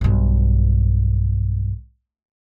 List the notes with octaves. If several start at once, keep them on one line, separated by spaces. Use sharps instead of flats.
B1 G2